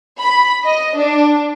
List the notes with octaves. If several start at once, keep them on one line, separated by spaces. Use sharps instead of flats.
B5
D#5
D4